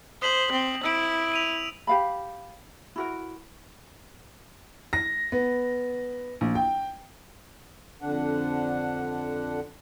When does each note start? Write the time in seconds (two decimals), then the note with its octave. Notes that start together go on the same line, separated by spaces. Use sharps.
0.22 C5 D#6 B6 F#7
0.52 C4
0.83 E4 E6 D7
1.32 D7 D#7 F7
1.87 G4 F5 B5
2.96 E4 F#4 A#4
4.93 A#6
5.32 B3
6.41 A#1
6.55 G5
8.02 F2 D3 D4 F#5